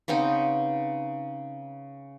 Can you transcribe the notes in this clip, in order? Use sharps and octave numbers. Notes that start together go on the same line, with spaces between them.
C#3 B3 C4 D#4